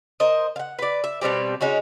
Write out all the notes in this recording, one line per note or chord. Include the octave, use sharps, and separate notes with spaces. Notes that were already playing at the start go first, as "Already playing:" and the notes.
A#4 C5 D#5
F5 F#5
B4 D5
E5
B2 G3 C4 G4
G#3 C#4 D#4 F#4